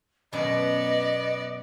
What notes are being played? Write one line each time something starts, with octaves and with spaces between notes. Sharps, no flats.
F#2 B2 B3 D5 D#5